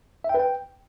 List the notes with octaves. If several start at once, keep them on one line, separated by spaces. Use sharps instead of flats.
E5
G5
B4
G5